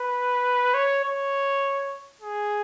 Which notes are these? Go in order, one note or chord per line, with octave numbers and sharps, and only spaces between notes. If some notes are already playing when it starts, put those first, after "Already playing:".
Already playing: B4
C#5
C#5
G#4